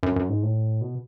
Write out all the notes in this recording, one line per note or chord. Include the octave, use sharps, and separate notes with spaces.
F#2
F#2
G#2
A2
B2